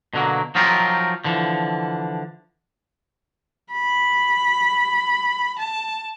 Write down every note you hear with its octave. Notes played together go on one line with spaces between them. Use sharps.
B2 D3 F#3 A#3
F3 F#3 D#4 F4 G4 A#4
D3 E3 F3
B5
A5